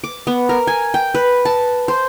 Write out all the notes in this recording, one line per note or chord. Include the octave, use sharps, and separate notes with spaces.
D6
B3
A#4
G#5
G5
B4
A5
C5